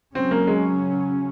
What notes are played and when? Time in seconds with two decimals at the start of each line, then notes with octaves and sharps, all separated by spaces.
0.15 C#3 F#3 C4 C#4
0.31 A#3
0.47 G#3